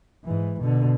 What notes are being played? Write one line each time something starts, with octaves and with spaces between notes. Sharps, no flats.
G#2 E3
B2 D3